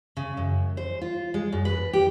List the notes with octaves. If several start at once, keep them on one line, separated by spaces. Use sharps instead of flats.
C#3
F#2
C5
F4
G#3
F#2
B4
G4